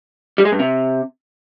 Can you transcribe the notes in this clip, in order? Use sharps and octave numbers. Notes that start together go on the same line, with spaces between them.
G3
G#3
G2
C3